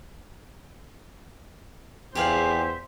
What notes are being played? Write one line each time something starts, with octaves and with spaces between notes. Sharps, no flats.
E2 G4 G#4 C5 E5 F5